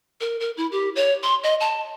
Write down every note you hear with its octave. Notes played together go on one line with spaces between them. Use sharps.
A#4
A#4
E4
G4
C#5
C6
D#5
A5